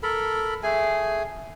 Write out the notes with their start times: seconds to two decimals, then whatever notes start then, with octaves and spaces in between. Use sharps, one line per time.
0.03 A4 A#4 B5
0.63 A3 G#4 G#5